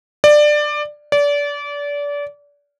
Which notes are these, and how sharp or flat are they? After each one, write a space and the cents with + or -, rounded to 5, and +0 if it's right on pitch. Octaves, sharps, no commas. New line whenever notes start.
D5 +15
D5 -30